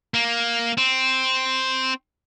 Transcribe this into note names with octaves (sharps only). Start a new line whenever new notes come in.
A#3
C4